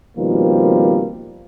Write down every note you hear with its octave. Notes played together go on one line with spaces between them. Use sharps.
B2 D#3 F3 G3 A#3 C4